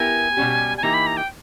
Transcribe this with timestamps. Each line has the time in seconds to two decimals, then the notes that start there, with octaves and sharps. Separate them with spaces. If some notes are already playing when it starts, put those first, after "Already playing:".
Already playing: B3 E4 G4 A#4 G#5
0.37 B2 G3 C#4 G4
0.77 G#5
0.83 E3 A#3 D#4 G4 A#5
0.94 B5
1.07 A#5
1.17 G5